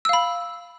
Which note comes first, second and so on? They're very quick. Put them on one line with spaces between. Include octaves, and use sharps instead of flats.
E6 F5 B5